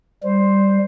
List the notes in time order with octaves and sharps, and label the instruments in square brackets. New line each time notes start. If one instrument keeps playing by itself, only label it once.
[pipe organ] G3 [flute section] C5